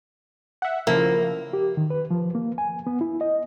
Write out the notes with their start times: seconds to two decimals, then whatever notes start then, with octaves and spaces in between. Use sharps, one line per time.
0.62 E5 F#5
0.87 C#3 F3 A#3 E4
1.53 G4
1.77 D#3
1.90 B4
2.11 F3
2.35 A#3
2.58 G#5
2.87 B3
3.01 E4
3.21 D#5